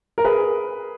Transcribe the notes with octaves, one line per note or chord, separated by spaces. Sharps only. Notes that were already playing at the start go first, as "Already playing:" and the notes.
A#4
G#4 B4